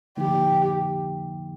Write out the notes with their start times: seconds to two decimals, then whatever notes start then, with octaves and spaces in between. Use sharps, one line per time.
0.17 D3 F3 A#3 D#4 G4